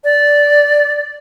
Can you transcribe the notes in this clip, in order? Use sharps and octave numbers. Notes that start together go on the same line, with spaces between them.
D5